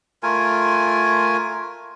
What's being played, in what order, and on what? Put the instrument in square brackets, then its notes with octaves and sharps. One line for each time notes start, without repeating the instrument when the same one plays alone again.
[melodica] A3 F4 A#4 G#5